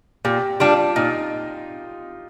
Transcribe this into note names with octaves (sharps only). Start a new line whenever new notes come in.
A#2 G4
G3 D4 F4 G4
A#2 D#4